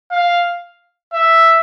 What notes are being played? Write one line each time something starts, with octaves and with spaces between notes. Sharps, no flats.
F5
E5